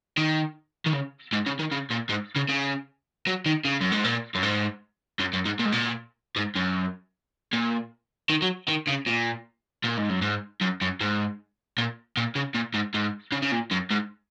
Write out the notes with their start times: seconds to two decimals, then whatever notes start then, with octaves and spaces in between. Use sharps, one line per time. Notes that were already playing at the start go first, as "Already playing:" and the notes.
0.18 D#3
0.87 D#3
0.94 C#3
1.33 G#2
1.47 C#3
1.59 D#3
1.72 C#3
1.91 A#2
2.10 G#2
2.36 C#3
2.49 C#3
3.27 F#3
3.46 D#3
3.65 C#3
3.81 F#2
3.92 G#2
4.05 A#2
4.35 F#2
4.43 G#2
5.20 F#2
5.33 F#2
5.45 G#2
5.59 A#2
5.65 G#2
5.72 A#2
6.36 G#2
6.56 F#2
7.53 A#2
8.30 D#3
8.42 F#3
8.68 D#3
8.87 C#3
9.06 A#2
9.84 A#2
9.97 G#2
10.09 F#2
10.22 G#2
10.62 F#2
10.82 F#2
11.01 G#2
11.78 A#2
12.17 A#2
12.36 C#3
12.55 A#2
12.74 G#2
12.94 G#2
13.32 C#3
13.42 C#3
13.52 A#2
13.71 F#2
13.91 G#2